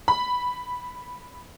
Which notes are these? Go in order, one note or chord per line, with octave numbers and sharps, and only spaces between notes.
B5